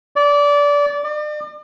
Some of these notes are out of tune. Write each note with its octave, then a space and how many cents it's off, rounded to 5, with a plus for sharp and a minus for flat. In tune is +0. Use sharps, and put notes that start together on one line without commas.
D5 -20
D5 +40